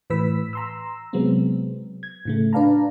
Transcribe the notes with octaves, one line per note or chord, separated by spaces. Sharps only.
A2 E3 B4 E6 B6
A#5 C6 E6
C3 F#3 G#3 B3 C4
G#6
A2 C#3 A3
D4 B4 D5 F5 A5 A#5